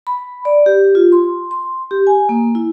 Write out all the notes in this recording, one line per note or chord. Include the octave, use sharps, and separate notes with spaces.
B5
D5
G4
F4
C6
C6
G4
G#5
A#3
E4